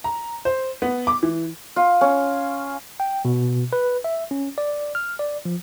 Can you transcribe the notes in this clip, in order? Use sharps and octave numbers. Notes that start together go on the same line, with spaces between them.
A#5
C5
B3
D6
E3
F4
C#4
G5
B2
B4
E5
C#4
D5
F6
D5
F3